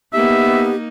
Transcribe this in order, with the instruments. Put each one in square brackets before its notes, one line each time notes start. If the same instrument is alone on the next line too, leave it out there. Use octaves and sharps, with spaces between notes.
[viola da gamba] A#3 D#4 [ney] B3 [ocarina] G4 [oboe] E5